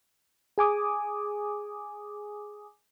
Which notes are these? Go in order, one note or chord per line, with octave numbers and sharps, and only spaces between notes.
G#4 G#5 D6 D#6